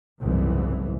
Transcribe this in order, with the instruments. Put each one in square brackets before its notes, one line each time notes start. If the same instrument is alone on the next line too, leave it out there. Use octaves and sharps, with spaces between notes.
[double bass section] F#1 C2 G#2 E3